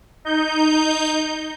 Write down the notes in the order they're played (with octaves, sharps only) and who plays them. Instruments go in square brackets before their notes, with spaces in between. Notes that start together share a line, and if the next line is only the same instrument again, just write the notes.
[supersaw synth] D#4 G6